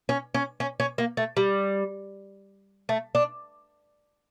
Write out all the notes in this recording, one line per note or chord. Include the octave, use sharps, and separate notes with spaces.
C#4
C#4
C#4
C#4
A#3
A3
G3
A3
D4